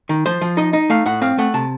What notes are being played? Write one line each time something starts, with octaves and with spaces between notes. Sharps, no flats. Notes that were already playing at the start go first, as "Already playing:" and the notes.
D#3
F3 C5
F3
D#4 D#5
D#4
A3 F5
A2 F#5
C4 F5
A3 F#5
C3 A5